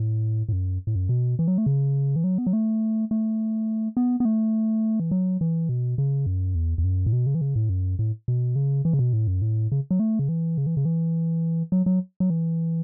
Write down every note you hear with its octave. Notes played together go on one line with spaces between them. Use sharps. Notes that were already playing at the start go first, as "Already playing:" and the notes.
Already playing: A2
A2
F#2
A2
F#2
B2
E3
F#3
A3
C#3
E3
F#3
B3
F#3
A3
A3
B3
B3
A3
E3
F#3
E3
B2
C#3
F#2
E2
E2
F#2
A2
B2
C#3
E3
C#3
A2
F#2
A2
B2
C#3
E3
C#3
B2
A2
F#2
A2
C#3
F#3
A3
C#3
E3
C#3
E3
C#3
E3
F#3
F#3
F#3
E3